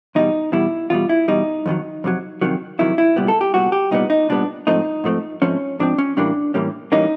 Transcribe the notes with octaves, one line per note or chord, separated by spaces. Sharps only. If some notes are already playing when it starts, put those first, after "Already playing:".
E2 B2 G3 D#4
E2 B2 G3 E4
E2 B2 G3 F4
E4
E2 B2 G3 D#4
F2 C3 D#3 F#3
F2 C3 D#3 F#3
F2 C3 D#3 F#3
F2 C3 D#3 F#3 E4
E4
C2 A#2 G3 B3
A4
G4
C2 A#2 G3 B3 F#4
G4
C2 A#2 G3 B3 D#4
D#4
C2 A#2 G3 B3 D4
G#2 F3 A3 C4 D#4
G#2 F3 A3 C4
G#2 F3 A3 C4 C#4
G#2 F3 A3 C4 D4
C#4
A2 E3 G3 A#3 C#4 D4
A2 E3 G3 A#3 C#4
A2 E3 G3 A#3 C#4 D#4